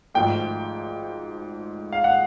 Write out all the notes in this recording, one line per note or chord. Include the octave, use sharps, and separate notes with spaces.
G#1 G#2 F3 A3 G5
F5
F#5